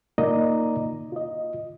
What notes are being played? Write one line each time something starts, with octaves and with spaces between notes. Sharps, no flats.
A#3 D#4 F4 D5 D#5 A#5
F4 D#5